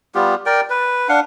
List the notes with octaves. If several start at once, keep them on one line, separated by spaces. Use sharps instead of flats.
G3 B3 F4 G4
A#4 D5 G5
B4
D4 F5 F#5